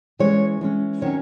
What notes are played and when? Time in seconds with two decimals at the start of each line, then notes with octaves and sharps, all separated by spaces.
0.19 E3 G#3 C#4 C#5
0.61 E3 G#3 C#4
1.02 D#3 F#3 C#4 C#5